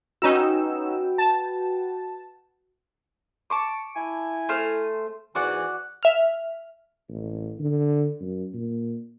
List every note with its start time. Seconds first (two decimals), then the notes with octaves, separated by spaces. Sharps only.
0.22 C#4 D#4 F#4 B4 G5 E6
1.18 A5
3.50 A5 C#6 D6
3.96 E4 G#5
4.49 A3 C5 F6
5.35 E2 G#2 E3 F#4 D5 F#5
6.03 E5 F6
7.09 A1
7.59 D3
8.21 F#2
8.54 A#2